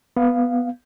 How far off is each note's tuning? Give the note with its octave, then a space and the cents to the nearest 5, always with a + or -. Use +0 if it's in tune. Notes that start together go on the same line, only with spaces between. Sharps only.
B3 +0 F5 +0